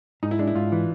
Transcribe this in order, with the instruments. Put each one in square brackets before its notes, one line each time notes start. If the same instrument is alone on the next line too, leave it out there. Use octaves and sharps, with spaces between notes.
[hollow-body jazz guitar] G#2 [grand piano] D#4
[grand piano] E4
[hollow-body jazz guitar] G#3 [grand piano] D4
[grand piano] E4
[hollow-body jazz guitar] G#2 [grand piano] F4
[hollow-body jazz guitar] E3